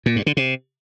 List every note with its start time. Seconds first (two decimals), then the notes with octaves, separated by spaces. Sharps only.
0.06 A#2
0.16 G2
0.26 D3
0.37 C3